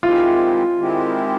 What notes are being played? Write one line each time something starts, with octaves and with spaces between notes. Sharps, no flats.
D#3 G#3 C4 E4 F4 G4
D#3 G#3 C4 E4 G4